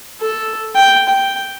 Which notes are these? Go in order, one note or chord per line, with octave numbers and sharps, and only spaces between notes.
A4
G5
G5